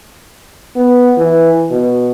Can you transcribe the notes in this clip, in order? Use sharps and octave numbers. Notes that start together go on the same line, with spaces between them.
B3
E3
B2